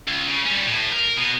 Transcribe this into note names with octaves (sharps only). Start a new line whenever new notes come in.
C#2
C#3
G3 C#4
A2
A#4
B2 B3